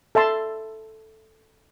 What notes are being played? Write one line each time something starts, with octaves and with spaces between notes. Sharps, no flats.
A4 E5 A5 C6